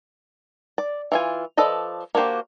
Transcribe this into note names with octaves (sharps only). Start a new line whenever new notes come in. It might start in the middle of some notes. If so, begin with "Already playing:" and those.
D5
E3 F4 G#5
F3 A4 B4 D5 D#5
A#3 D4 F#4 G4 C5